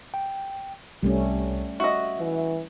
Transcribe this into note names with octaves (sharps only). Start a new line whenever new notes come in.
G5
C2 G3 A3 C#4
F#4 D#5 E5
E3